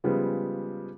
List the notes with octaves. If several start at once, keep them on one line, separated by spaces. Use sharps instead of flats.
C#3 F3 G3 G#3 B3